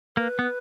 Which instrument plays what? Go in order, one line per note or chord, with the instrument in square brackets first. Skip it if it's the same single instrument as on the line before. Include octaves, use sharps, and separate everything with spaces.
[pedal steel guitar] A#3 [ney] B4
[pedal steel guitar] B3